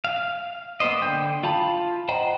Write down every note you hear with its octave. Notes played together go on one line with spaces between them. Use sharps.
F5
A#3 B3 C5 D#5
D3 G5 G6
F4 F5 A5 B5
C5 D#5 F#5 G5 A#5